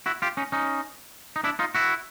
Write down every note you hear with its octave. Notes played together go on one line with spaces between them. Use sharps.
E4 F#4
F4 G4
C#4 D#4
C#4 D#4
D#4
D4 E4
D#4 F4
E4 F#4